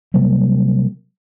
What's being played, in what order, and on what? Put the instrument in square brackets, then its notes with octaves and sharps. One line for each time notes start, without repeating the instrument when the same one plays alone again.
[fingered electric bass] C3 F#3 G3 A#3